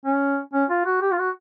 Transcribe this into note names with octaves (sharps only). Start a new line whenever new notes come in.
C#4
C#4
F4
F#4
G4
F4
F#4